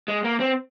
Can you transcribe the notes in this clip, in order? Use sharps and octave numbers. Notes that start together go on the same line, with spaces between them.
G#3
A#3
C4